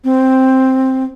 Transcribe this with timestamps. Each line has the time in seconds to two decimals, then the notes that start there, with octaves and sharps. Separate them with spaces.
0.04 C4